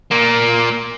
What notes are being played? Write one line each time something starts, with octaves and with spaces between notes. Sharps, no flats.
A#2 A#3